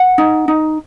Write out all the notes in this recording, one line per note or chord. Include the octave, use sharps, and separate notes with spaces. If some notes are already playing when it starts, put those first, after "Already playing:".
Already playing: F#5
D#4
D#4